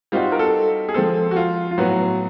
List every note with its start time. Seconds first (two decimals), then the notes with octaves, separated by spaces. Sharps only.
0.12 G3 C4 D#4 F4 F#4
0.32 A#4
0.39 A4
0.89 G#4
0.94 F3 G#3 C4 A4
1.31 F#4
1.36 F4
1.71 F4
1.78 A2 F#3 B3 F#4